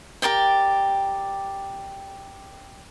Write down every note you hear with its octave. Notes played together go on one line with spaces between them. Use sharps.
G4 A#4 D5 G5